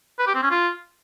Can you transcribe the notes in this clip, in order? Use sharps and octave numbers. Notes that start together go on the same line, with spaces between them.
B4
G4
C4
C#4
F4